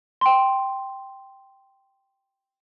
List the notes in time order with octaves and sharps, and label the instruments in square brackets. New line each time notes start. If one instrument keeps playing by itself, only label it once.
[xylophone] G5 C6